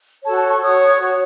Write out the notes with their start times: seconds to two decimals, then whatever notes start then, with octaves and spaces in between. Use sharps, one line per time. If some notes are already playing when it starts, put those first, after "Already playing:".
0.25 F#4 A4 C#5 A5
0.37 A5
0.49 C#6
0.61 F#4 C#5 D#6
0.98 F#4 C#5